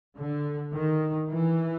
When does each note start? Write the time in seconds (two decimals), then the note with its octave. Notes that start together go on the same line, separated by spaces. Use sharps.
0.15 D3
0.73 D#3
1.29 E3